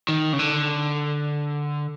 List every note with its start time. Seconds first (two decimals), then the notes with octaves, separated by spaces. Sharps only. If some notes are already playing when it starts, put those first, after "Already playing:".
0.09 D#3
0.33 C#3
0.39 D3